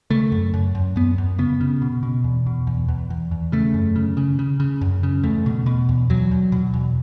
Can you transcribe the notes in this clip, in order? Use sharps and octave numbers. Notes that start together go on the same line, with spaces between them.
C#3 A3
F#2
F#2
F#2
F#2 B3
F#2
C#3 B3
C#3
B2
B2
E2
B2
E2
E2
E2
E2
C#3 A3
F#2
C#3
C#3
C#3
C#3
F#2
C#3
E2 A3
B2
B2
E2
E2 F#3
E2
B2
E2